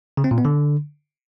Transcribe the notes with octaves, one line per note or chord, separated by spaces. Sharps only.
C#3
C4
A#2
B3
D3